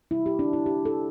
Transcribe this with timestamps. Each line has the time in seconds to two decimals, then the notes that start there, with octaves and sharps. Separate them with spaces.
0.11 C3 G3 E4
0.26 G4
0.39 D4
0.53 E4
0.66 G4
0.85 A4